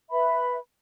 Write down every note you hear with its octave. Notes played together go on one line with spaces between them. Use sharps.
B4 E5 B5